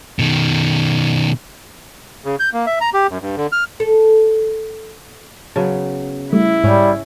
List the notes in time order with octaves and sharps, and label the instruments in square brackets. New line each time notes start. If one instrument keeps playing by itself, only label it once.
[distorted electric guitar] B2 D#3
[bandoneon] C#3
G6
A#3
E5
A#5
G4
F#2
G2
D3
F6
[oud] A4
[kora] C#3 F#3 B3 [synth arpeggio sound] A5
[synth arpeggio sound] G3 A3 [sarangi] E4
[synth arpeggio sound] G#2 [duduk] G3 [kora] C#4 G5